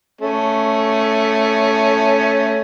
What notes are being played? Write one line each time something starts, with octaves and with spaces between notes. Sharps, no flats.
A3 C#4